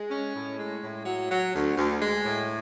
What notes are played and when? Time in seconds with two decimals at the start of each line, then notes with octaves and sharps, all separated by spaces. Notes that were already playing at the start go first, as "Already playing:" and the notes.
Already playing: G#3
0.10 C#4
0.35 A2
0.58 G#3
0.83 A2
1.06 F#3
1.31 F#3
1.54 D2
1.77 D2
2.01 G#3
2.25 A2